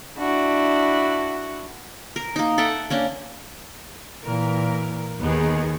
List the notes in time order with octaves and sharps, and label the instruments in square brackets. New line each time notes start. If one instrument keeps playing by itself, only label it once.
[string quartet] D4 E4 F#4
[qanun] A#4
A#3 D#4
A4 E5 F#5 G5
A#3 C#4 D4
[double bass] A#2 E3 [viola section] A#4
[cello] D#2 [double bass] D#3 [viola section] B3 G4 G#4